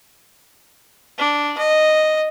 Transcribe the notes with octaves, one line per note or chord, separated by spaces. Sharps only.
D4
D#5